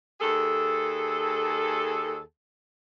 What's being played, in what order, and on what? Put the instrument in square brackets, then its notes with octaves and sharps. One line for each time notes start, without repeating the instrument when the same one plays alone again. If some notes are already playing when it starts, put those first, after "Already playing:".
[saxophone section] D#2 G#4 A4